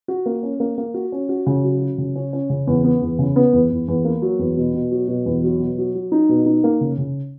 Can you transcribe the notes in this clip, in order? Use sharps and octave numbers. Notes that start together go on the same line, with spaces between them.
F#4
A#3
C#4
A#3
A#3
F#4
C#4
F#4
C#3
F#3
F#3
C#3
C#4
C#4
C#3
E2
B3
E2
C#3
B3
E2
E2
E2
A#3
F#3
E2
B2
B2
F#3
B2
E2
F#3
B2
F#3
F#3
D#4
B2
D#4
A#3
C#3
C#3